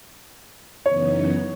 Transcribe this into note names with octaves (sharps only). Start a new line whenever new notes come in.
F#2 C#3 E3 B3 D#4 C#5